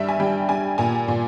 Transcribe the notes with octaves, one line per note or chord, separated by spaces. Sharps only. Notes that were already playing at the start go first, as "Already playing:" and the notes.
Already playing: G2 G3 E5
G#5
G3 G5
G3 G#5
A#2 G#5
A#2